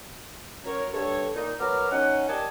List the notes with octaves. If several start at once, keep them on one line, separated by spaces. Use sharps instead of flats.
F#2 A#4 C#5
G2 A4 C#5
A#2 D#4
F#3 B3 A#4 A#5 D6 F6
C#4 D#4 F#5
G4 A#4 D5 D#5 G#5 A5